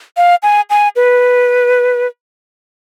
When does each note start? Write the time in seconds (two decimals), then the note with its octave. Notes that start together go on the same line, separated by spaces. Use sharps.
0.17 F5
0.43 G#5
0.70 G#5
0.96 B4